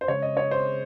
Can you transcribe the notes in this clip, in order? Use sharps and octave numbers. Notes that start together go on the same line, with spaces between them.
C5
C#3 G#3 C#5
D#5
C#5
C5